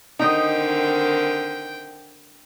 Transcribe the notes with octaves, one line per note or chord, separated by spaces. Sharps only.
D3 D#3 C4 D#4 D#5 G5